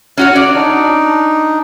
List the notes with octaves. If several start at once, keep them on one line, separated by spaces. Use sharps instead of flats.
C#4 F#4 C#5 F#6
D5
D4 D#4